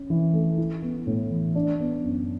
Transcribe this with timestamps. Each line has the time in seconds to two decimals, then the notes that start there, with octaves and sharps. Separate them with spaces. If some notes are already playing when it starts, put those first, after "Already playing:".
Already playing: C#4
0.10 E3
0.34 A3
0.58 E4
0.82 B3
1.07 A2
1.30 E3
1.55 D4
1.80 B3
2.04 F#2